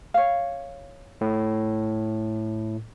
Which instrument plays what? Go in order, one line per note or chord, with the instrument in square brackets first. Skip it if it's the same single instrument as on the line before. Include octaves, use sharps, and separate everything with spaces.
[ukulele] C#5 F5
[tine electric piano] A2